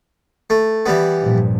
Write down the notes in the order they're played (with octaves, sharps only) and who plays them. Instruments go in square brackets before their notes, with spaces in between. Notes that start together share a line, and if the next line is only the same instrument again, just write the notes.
[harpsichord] A3
E3 G3 B3
[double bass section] G2 A#2 F3